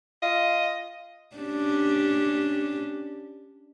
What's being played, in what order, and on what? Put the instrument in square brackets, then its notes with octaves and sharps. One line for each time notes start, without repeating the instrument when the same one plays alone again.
[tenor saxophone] F4 [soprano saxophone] D#5
[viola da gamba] C#4 D4 G4